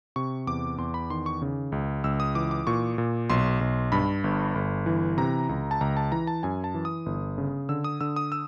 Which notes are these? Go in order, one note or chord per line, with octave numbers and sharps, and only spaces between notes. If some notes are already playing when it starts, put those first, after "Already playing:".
C3 C#6
E2 D6
E2 C6
B5
D#3 C6
C#6
C#3
C#2
C#2 E6
D#6
E3 D6
D6
A#2 C#6
A#2
B1 C6
B1
G2 B5
G1
G1
E3
C3 A#5
C#2
A5
C#2 A#5
A5
E3 A#5
A5
F#2 G#5
A5
E3
D#6
G1
C#3
D3 E6
D#6
D3 E6
D#6
E6